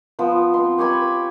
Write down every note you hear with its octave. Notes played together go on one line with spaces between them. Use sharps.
F3 B3
C4 C6
G4 C#5 G#5 B5